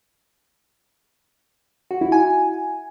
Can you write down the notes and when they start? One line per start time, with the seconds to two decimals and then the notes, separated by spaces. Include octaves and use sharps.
1.91 F#4
2.01 E4
2.12 G#5